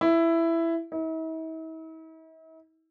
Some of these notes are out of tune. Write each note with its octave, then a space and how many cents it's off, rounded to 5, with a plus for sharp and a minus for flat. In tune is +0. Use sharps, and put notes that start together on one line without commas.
E4 +10
E4 -45